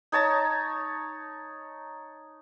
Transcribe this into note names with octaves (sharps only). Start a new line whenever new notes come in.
D#4 C#5 A5 A#5